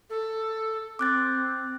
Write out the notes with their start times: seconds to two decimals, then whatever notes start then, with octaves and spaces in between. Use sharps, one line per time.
0.10 A4
0.99 C4 D6 F#6 A6